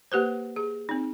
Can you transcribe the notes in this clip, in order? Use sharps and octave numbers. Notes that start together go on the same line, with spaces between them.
A#3 G4 B4 C5
G#4
C4 D#4